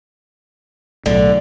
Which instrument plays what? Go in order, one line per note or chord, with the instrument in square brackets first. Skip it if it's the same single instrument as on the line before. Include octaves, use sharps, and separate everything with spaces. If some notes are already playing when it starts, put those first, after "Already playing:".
[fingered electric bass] B1 A2 [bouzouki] D3